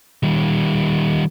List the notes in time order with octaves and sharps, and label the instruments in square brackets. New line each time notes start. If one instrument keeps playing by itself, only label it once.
[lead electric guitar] D#3 G3